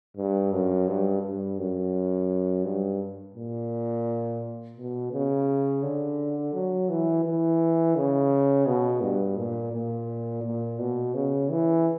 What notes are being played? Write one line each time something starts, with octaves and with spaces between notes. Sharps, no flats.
G2
F#2
G2
G2
F#2
G2
A#2
B2
C#3
D3
F#3
E3
E3
C#3
B2
G2
A#2
A#2
A#2
B2
C#3
E3